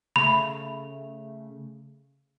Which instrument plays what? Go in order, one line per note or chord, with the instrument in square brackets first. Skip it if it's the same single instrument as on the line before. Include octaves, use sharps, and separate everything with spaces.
[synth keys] C#3 A3 [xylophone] B5